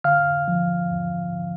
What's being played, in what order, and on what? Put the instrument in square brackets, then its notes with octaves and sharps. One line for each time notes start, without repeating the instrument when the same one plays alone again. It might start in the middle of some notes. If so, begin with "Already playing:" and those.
[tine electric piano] D3 F5 F6
F3
E2